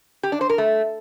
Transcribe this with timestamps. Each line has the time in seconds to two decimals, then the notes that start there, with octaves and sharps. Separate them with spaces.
0.23 G4
0.32 D4
0.41 C5
0.50 A#4
0.58 A3